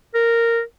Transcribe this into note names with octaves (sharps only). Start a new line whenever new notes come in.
A#4